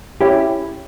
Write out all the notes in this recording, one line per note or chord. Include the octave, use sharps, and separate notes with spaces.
C#4 E4 G4